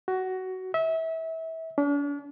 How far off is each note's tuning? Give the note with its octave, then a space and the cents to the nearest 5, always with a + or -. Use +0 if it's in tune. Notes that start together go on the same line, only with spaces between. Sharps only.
F#4 +15
E5 -25
D4 -40